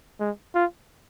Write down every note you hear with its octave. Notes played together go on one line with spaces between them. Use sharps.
G#3
F4